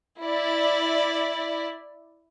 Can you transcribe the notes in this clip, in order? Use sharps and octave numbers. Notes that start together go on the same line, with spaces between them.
E4 D5